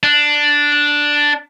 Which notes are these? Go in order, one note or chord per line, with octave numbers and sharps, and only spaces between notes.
D4